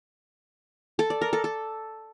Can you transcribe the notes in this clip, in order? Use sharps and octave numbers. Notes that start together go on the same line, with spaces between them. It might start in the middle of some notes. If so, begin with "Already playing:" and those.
A4
D5
A#4
A4
A4